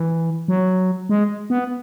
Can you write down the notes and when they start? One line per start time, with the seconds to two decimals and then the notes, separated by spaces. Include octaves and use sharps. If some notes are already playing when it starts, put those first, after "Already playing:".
Already playing: E3
0.48 F#3
1.09 G#3
1.50 B3